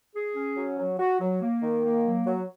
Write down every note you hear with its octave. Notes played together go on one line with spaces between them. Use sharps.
G#4
C#4
F#3
F#3
F#4
F#3
A#3
D#3
A#3
F#3
F#3